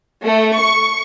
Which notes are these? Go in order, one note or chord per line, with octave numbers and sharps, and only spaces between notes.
A3
C#6